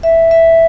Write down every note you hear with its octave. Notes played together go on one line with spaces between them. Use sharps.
E5
E5